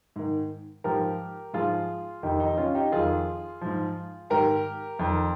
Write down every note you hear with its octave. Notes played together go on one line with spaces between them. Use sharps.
G#2 D#3
G#2 F3 G4 A#4
G#2 F3 F4 G#4
F2 D#3 D#4 G4
D#4 G4
C#4 F4
D#4 G4
F2 D#3 F4 G#4
G#2 F3
G#2 D#3 G4 A#4
F2 D#3